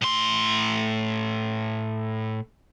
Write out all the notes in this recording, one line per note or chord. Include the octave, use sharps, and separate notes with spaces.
A2 C6